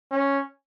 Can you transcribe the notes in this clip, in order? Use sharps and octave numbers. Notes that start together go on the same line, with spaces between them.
C#4